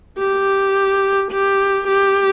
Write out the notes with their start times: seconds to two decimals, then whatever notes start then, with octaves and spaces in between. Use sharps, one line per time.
0.18 G4
1.31 G4
1.88 G4